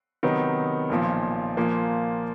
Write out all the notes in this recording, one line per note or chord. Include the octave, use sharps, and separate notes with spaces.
C3 D#3 F#3 B3 D#4
B1 A#2 F3
A#2 F3 A#3